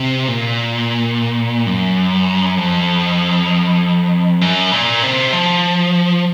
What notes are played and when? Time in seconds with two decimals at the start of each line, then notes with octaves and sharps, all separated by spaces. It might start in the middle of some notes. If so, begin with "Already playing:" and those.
Already playing: C3
0.28 A#2
1.67 F#2
2.57 F2
4.41 F#2
4.72 A#2
5.03 C3
5.33 F3